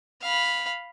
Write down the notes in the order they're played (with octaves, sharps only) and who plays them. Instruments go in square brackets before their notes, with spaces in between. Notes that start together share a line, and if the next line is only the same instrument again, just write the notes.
[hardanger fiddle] F5 B5